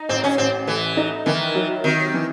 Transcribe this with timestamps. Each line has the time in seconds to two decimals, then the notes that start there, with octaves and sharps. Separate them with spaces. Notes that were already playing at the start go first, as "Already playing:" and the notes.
Already playing: D#4
0.09 A1 C4
0.24 C#4
0.38 A1 C4
0.67 E3 A3
0.97 D#4
1.26 D#3 E3
1.55 F#3
1.84 C3 D#3
2.14 E3